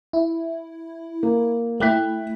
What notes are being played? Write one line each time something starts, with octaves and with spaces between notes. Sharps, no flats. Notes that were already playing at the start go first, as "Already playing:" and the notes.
E4
A#3
A3 E4 G5 F#6 B6